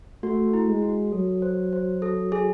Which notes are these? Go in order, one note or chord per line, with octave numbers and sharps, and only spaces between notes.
A3 F#4
E4
G#3
F#4
F#3 A4
C5
C5
A4
G#4